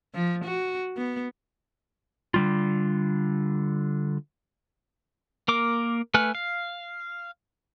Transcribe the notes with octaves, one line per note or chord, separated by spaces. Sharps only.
F3
F#4
B3
D3 G3 F4
A#3 A#4 D6
A3 B4 G#5 F6
F5